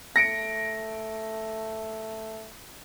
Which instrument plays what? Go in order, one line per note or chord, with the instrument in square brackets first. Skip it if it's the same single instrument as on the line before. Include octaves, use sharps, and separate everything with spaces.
[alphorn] A3 [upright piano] A#6 C#7 D7